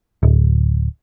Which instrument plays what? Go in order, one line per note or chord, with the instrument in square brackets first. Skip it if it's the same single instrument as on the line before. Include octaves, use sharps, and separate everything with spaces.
[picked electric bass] D1